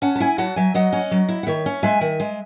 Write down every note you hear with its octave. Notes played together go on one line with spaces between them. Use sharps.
C#4 F#5 A5
A5
E4 E5 G#5
F#3 F#5 A5
F#3 E5 G#5
F#3 D#5 F#5
C#4
F#3
E4
F#5
D#3 C#5 E5
C#4
G#3 E5 G#5
D#3
G#3